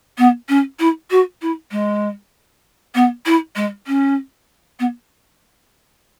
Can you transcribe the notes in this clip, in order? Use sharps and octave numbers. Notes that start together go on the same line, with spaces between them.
B3
C#4
E4
F#4
E4
G#3
B3
E4
G#3
C#4
B3